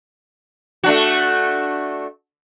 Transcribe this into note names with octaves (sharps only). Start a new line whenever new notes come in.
A3 D4 F#4